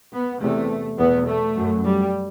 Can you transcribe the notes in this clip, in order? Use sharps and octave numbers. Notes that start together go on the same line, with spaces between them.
B3
E2 C3 A3
E2 B2 B3
A3
F#2
G3